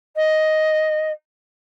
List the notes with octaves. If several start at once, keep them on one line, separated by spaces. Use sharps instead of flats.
D#5